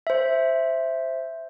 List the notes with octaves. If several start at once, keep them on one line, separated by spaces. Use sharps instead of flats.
C5 E5